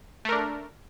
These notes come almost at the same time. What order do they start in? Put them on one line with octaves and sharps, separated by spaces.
A3 A#4 D4